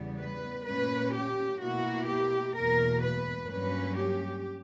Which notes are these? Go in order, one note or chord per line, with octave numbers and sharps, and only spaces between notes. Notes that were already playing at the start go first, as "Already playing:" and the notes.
Already playing: E2 C#3 G3 B3
B4
A#2 A#3 C#4 B4
G4
B2 A#3 E4 F#4
G4
E2 B2 A#3 A#4
B4
G2 F#3 A#3 C#4 B4
G4